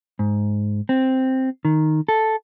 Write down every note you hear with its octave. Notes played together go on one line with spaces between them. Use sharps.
G#2
C4
D#3
A4